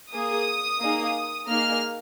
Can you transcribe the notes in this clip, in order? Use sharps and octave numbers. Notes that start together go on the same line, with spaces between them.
A#3 G#4 D#6
A#3 D#4 G#4
A#3 D#4 G#4 F6